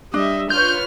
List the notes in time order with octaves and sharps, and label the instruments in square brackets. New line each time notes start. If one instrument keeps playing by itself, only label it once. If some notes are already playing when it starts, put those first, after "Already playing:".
[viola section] G3 E5 [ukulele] D4 [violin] D#5
[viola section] F4 B4 C#5 [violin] F6 [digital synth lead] G6